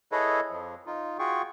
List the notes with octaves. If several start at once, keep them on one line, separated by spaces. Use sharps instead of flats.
E4 G#4 A4 B4 C#5 D#5
F2 F3
D#4 F4
F4 F#4 G#4 G5 C#6